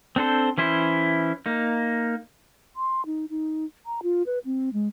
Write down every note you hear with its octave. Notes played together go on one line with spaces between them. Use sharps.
C4 D4 A4 C5
E3 C#4 E4 C5
A#3 D#4
C6
D#4
D#4
A#5
F4
B4
C4
G#3